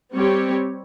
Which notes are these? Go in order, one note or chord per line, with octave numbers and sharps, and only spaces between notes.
G3 C4 G4 C#5